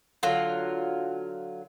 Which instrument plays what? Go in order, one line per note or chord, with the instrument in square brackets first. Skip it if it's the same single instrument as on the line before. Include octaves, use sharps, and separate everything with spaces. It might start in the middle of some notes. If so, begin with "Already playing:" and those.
[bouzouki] D3 F#3 F4